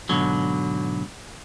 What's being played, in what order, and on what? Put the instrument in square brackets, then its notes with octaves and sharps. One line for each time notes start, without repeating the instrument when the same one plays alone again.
[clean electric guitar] G#2 B2 D3 F#3